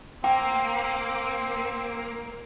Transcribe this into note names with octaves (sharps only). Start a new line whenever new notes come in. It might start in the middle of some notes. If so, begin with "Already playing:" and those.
A#3 C4 G5